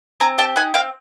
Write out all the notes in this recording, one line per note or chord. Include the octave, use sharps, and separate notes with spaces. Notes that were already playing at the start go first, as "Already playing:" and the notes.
C4 G#5 A#5
G4 G5 A5
D#4 F#5 G#5
C4 F5 G5